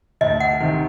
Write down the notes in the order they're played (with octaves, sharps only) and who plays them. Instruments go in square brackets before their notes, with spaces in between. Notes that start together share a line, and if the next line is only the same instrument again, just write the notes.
[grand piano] D2 [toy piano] D#5
[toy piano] F#5
[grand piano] C3 D#3